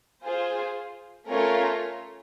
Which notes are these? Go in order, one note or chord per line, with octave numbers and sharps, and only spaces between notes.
F4 G#4 C5
A3 C#4 F4 A#4 C#5